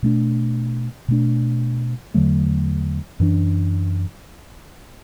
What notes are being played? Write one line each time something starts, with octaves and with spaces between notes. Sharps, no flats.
B2 A3 D4
B2 A3 D4
E2 D3 F#3 A3
F#2 E3 B3 D4